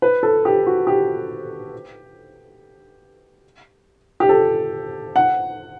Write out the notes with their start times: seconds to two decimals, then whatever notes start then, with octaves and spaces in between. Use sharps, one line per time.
0.02 B4
0.23 A4
0.45 G4
0.67 F#4
0.87 G4
4.20 G4
4.29 A4
5.16 F#5